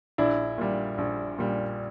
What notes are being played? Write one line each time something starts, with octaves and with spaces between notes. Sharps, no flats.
A#1 D4 E4
A#2 G3
A#1
A#2 G3